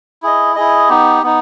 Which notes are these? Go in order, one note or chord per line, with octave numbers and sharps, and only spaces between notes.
E4 G#4 D#5
E4 G#4 D#5
B3 D#4 G4
B3 D#4